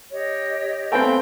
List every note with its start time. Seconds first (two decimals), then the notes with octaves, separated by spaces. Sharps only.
0.12 G4 C#5 D#5
0.92 A3 B3 C4 A4 F5 G5 G#5